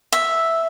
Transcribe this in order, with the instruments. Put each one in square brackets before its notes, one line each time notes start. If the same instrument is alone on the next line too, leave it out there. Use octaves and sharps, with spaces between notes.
[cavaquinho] E5